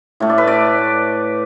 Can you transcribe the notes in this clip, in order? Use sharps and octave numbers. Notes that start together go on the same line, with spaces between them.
A2 A3
D5
B4
D5